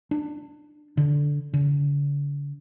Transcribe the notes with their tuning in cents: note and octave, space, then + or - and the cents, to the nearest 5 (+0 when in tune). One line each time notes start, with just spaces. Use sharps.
D4 +25
D3 -10
D3 -45